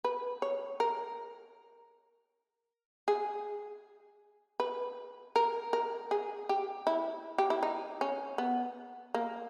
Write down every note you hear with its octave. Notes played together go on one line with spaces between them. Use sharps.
B4
C#5
A#4
G#4
B4
A#4
A#4
G#4
G4
E4
G4
E4
D#4
C#4
B3
A#3